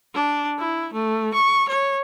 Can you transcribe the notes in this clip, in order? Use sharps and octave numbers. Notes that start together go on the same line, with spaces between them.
D4
E4
A3
C#6
C#5